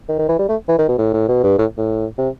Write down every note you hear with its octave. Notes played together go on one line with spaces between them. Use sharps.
D#3
D#3
E3
G3
A3
E3
D#3
B2
A2
A2
B2
G2
A2
A2
C3